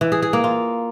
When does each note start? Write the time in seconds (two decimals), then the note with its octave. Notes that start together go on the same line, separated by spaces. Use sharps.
0.01 E3
0.12 G#4
0.22 G#4
0.33 A#3
0.44 F4